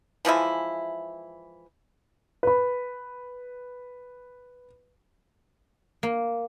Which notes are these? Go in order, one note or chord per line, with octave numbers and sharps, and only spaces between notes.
E3 F3 G#3 E4
B4 B5
A#3